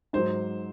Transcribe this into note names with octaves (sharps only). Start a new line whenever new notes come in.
G#2 F#3 C5